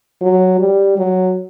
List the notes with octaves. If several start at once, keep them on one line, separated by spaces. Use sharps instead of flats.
F#3
G3
F#3